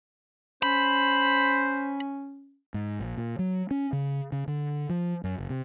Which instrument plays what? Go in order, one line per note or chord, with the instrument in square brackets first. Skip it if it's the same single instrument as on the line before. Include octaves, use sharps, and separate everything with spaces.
[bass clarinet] C#4 [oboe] C5 [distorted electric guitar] B5
[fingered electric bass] G#2
A#1
A#2
F#3
C#4
C#3
C#3
D3
F3
F#2
F#1
C3